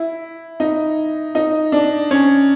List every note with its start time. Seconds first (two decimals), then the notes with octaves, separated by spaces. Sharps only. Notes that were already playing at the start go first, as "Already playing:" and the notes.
Already playing: E4
0.60 D#4
1.35 D#4
1.72 D4
2.11 C#4